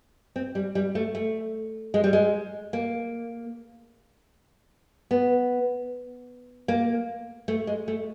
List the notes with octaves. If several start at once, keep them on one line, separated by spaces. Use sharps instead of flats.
C4
G3
G3
A3
A3
G#3
G3
G#3
A#3
B3
A#3
A3
G#3
A3